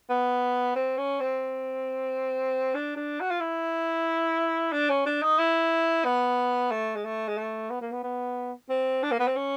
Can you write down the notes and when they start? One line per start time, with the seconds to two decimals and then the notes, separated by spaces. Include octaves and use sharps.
0.09 B3
0.75 C4
0.98 C#4
1.20 C4
2.74 D4
2.96 D4
3.21 F#4
3.31 F4
3.40 E4
4.72 D4
4.90 C#4
5.06 D4
5.22 D#4
5.38 E4
6.05 B3
6.71 A3
6.96 G#3
7.05 A3
7.28 G#3
7.37 A3
7.70 B3
7.81 A#3
7.92 B3
8.03 B3
8.69 C4
9.03 D4
9.11 A#3
9.20 B3
9.27 C4
9.36 C#4